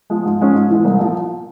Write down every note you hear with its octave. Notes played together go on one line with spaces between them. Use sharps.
F3 G#3
G#2
F3 G#3 C#4
G#2
E3 G#3
C2
A#2 F3